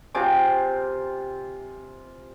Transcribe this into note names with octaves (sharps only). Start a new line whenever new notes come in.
C3 F4 G#5 D6